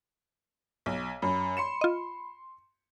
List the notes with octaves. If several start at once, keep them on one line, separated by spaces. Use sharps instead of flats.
B1
F#2 B5
C6 C#7 E7
F4 D#5